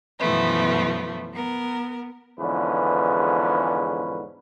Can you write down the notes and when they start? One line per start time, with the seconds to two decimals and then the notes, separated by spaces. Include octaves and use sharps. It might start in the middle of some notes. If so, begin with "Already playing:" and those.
0.19 F#2 B2 E3 F3 A3 B3
1.33 B3 A#4
2.39 E2 G#2 D3 F3 C#4 B4